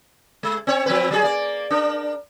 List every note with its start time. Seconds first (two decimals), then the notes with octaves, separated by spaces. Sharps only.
0.43 G#3
0.67 C4 C#5
0.86 F3 C4 B4
1.11 F#3 G#4
1.23 A#3 D5
1.70 D4 A#4